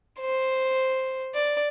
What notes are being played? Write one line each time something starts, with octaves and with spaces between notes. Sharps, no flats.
C5
D5